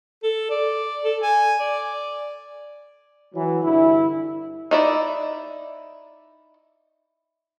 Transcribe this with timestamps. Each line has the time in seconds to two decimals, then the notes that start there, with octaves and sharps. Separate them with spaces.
0.23 A4
0.51 D5
1.05 A4
1.23 G#5
1.60 D5
3.33 E3 F#3
3.63 G2 D3 E4
4.71 D#4 E4 D5